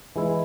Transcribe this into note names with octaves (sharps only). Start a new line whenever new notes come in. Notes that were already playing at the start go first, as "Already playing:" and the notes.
E3 G#3 E4